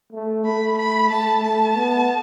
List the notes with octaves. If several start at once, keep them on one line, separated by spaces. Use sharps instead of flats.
A3
A3 B5
B5
A3 A5
A3 A5
B3